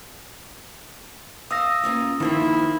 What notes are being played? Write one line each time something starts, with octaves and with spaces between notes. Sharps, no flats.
F5 D#6 E6 A#6
A#3 C#4 F4
D#3 F3 A#3 E4 F4